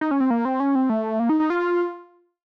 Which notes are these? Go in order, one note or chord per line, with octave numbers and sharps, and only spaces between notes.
D#4
C#4
C4
A#3
C4
C#4
C4
A3
A#3
D#4
D#4
F4